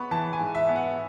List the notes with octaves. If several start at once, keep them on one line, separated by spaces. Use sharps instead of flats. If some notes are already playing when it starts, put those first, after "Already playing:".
Already playing: B3 B5 C#6
E3 A5
G#5
G#2
E5
B3
F#5